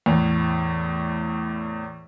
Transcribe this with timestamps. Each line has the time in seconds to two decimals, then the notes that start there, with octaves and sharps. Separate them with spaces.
0.06 E2 A2